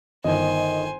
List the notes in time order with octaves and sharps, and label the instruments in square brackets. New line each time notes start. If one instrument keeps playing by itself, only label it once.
[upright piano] G1 D#3 [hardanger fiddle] C5 G#5 [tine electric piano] D#5